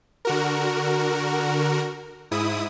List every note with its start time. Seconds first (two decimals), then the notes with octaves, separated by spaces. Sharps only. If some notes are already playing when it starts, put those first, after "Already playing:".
0.25 D3 F#4 A#4
2.31 G#2 E4 D#6